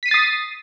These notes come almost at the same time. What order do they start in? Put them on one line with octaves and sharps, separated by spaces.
B6 D#7 C7 A6 D#6